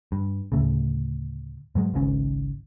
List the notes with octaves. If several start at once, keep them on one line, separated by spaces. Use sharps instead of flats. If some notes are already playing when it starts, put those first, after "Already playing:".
G2
D2 A2 C#3
G#2 F#3 G#3
G#1 C#2 G#2 C#4